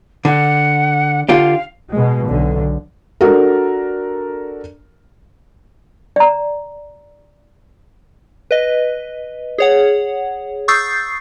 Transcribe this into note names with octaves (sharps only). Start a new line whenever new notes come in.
D3 F#5
D3 F4 G4 F5
B2 G#3
B1 D3
D4 F#4 A4 A#4
D5 A#5
B4 D#5
G#4 C#5 F#5
C#6 D#6 E6 G6 A6 C7